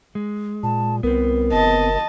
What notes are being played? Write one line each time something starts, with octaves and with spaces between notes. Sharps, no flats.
G#3
A#2 A5
C2 B3 C4 A#4
F#1 D#5 A5